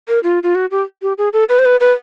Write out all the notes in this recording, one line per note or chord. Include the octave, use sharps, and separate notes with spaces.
A#4
F4
F4
F#4
G4
G4
G#4
A4
B4
C5
B4
B4